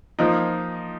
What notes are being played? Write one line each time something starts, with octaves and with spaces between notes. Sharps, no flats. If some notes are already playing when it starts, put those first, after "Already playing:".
F3 A#3 D#4